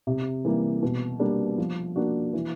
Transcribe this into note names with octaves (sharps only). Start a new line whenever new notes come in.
C3
E3 G3 A#3
B2
G3 A#3 D4
F3
A#3 D4 F#4
E3